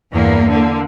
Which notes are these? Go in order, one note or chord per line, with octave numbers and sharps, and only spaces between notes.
E2 G2 A#3
D3 A#3